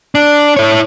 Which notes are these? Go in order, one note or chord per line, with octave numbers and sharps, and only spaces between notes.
D4
E4 C#5